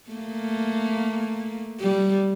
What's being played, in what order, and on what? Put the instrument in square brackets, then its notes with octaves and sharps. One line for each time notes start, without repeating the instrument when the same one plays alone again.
[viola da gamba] A3 A#3
G3